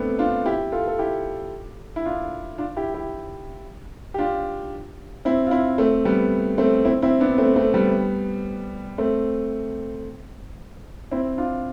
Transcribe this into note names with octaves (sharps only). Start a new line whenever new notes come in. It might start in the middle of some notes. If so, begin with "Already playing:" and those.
Already playing: A3 B3 C4 D4
D4 F4
E4 G4
F4 A4
A4
E4 G4
E4
D4 F4
D4 F4
E4 G4
E4 G4
G4
D4 F4
C4 E4
F4
C4 E4
A3 C4
G3 B3
A3 C4
C4 E4
C4 E4
B3 D4
A3 C4
A3 C4
G3 B3
A3 C4
C4 E4
D4 F4